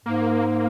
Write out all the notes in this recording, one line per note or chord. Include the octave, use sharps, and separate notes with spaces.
G#2 A#3